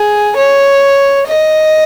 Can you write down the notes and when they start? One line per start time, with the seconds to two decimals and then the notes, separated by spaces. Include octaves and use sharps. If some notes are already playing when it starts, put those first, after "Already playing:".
Already playing: G#4
0.36 C#5
1.27 D#5